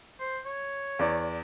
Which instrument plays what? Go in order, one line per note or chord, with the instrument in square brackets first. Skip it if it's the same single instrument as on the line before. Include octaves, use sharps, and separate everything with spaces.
[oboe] C5
C#5
[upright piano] E2 D5